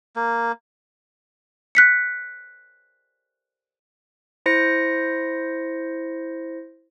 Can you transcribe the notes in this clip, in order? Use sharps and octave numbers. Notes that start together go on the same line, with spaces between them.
A#3
F#6 B6 C#7
E4 C5 A#6 C#7